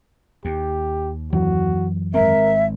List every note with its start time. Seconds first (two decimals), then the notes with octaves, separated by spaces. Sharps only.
0.45 D#2 G4
1.33 F#2 E3 F#3 F#4
2.14 G#1 G#3 C4 A#4 E5